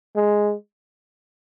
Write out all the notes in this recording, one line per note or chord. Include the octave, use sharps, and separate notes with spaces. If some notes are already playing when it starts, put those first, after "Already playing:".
G#3